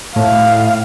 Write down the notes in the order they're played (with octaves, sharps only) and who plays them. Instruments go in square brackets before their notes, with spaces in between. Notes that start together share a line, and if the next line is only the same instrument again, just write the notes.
[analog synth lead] A2 [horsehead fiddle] F5